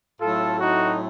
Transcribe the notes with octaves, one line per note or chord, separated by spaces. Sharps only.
A2 F#3 A3 C4 F4 A4
D#4 F#4